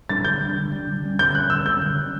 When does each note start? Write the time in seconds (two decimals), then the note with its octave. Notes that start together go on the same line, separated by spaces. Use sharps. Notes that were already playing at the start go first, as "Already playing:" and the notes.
0.09 G3 D4 A6
0.25 D3 G6
0.41 G3 D4
0.56 D3
0.72 G3 D4
0.87 D3
1.03 G3 C#4
1.19 D3 G6
1.34 G3 C#4 F#6
1.50 D3 E6
1.65 G3 C#4 G6
1.82 D3
1.96 G3 C#4